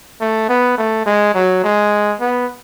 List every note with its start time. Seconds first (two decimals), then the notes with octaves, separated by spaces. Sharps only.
0.21 A3
0.49 B3
0.78 A3
1.06 G#3
1.34 F#3
1.64 G#3
2.21 B3